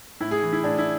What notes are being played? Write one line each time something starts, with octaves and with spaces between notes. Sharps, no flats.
A2 E4
G#4
E3
E4
A2 D4
E4